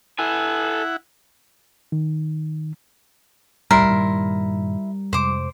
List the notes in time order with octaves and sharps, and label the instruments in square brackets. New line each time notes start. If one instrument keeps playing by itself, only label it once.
[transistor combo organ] E4 F#5 [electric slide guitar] A4 G#5
[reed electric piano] D#3
[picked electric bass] D#1 C2 A2 [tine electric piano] G3 [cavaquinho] E4 C6 [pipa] A#4
[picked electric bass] G2 A#2 D#3
[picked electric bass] F2 C3 G#3 [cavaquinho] C5 D6